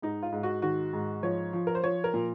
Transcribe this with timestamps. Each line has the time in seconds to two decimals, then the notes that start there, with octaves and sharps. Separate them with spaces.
0.02 G#2 D#4
0.23 F4
0.32 G#2
0.43 F#4
0.62 D#3 F#4
0.93 G#2
1.23 F3 C#5
1.53 F3
1.67 A#4
1.75 C5
1.84 F3 C#5
2.04 A#4
2.14 A#2